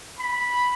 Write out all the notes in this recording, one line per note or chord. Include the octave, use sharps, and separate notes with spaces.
B5